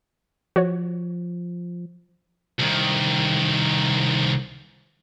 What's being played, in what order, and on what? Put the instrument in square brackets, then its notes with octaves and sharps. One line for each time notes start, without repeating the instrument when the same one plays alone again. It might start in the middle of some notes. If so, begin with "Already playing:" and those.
[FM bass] F3 [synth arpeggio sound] F#4 C#5
[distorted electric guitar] C2 D#3